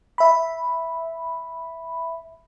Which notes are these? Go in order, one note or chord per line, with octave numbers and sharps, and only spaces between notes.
E5 B5